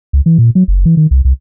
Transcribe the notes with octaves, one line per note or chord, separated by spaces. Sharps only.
C#2
E3
A#2
F#3
F#1
E3
D#3
C2
C2